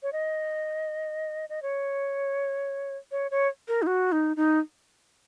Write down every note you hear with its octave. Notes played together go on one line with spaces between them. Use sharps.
C#5
D#5
D#5
C#5
C#5
C#5
A#4
D#4
F#4
D#4
D#4